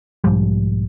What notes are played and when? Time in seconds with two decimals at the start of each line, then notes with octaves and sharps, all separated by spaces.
0.24 B1 G#2 F3 G3